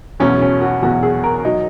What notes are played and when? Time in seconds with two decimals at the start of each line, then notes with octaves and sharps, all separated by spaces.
0.20 E2 B2 F#3 C#4
0.41 C#4
0.62 F#4
0.82 E2 B2 F#3 F#4
1.03 G#4
1.24 A#4
1.45 F#3 D#4